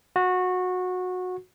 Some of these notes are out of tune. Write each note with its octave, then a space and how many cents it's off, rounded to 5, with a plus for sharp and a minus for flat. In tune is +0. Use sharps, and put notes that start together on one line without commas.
F#4 -20